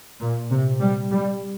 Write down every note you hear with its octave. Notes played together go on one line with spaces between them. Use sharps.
A#2
C3
G3
G3